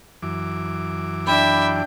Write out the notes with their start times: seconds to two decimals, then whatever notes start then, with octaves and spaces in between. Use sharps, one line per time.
0.23 F#2 E3 D6
1.27 D4 E5 G5 B5